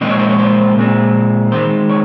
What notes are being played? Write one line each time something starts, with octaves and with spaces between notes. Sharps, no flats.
A#2 G#3 C4 D#5
C#5
C5
C#5
C5
A#2 G#3 C4
D#3 G#3 C4 C5
C#5